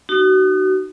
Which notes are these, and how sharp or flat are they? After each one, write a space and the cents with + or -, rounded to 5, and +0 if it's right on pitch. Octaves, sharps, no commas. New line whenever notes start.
D#4 -25 F#4 +30